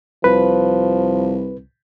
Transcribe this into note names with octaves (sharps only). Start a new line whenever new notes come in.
C2 F3 B4